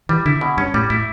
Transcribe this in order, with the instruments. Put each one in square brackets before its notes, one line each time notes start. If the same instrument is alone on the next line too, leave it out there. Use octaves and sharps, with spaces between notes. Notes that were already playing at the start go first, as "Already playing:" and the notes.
[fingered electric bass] E3 [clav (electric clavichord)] G3
[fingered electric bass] D3 [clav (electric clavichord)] E4
[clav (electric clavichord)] B2
[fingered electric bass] G2 [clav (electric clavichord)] C#4
[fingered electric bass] A2 [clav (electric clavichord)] G3
[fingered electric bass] A2 [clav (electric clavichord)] E4